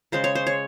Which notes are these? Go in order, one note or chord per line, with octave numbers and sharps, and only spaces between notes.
C#3 G#3 C5
C#5
C5
C#5